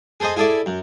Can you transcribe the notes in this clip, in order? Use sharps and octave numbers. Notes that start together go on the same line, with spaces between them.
G#4 A4 C5 D#5 G#5
E4 G#4 A4 D5 E5
F#2